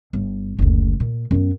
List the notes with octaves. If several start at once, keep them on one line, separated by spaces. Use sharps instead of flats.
G1
F#1 D2
A#2
F#2 B3